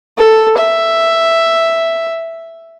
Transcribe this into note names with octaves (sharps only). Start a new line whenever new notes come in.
A4
E5